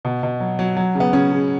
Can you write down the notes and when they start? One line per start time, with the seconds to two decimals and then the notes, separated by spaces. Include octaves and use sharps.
0.05 B2
0.23 B2
0.40 F#3
0.59 F#3
0.77 F#3
0.95 C#3
1.00 B3
1.13 C#3 C#4
1.32 C#3